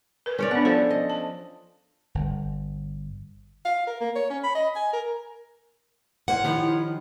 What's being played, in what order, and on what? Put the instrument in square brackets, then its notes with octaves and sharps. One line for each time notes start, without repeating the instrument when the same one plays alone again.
[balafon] A#4 B4
[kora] C#4 C#5 D5
[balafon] B3 D4 [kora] F#5
[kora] F3 A4 [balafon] C5 D5
[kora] D#5
[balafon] A5
[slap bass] G1
[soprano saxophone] F5
A#4
A#3
C#5
C#4
B5
D#5
G#5
A#4
[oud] A#3 C4 E4 [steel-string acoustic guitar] C#5 F#5
[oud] D#3 F3 G4 [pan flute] E4